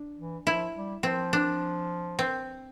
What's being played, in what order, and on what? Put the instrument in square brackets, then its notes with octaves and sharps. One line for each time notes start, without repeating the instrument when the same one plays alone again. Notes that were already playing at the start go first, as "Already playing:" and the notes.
Already playing: [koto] D4
[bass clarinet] E3
[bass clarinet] F3 [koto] E4
[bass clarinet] G3
[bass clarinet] F3 [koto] C4
[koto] D4
C4